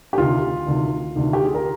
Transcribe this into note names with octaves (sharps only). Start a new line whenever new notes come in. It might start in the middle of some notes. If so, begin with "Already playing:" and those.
G4
D2 C3 D#3 F4
D2 C3 D#3
D2 C3 D#3
G4
G#4
A#4